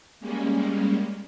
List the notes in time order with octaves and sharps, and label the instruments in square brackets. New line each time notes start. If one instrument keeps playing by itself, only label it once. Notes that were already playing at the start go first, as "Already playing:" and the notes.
[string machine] G3 G#3 A#3 C#4